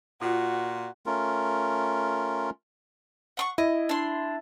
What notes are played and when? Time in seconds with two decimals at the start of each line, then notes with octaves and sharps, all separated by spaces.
0.22 A#2 F4 F#4
1.06 A3 C#4 F4 A#4
3.37 F#5 C6 C#6
3.58 E4 D#5
3.89 D4 C6